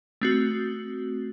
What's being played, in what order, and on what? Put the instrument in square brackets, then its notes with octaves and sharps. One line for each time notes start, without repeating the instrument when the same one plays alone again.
[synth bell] A3 C4 F#4